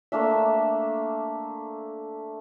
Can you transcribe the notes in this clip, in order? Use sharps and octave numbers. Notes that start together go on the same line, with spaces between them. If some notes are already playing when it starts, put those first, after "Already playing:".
A3 A#3 D4 E5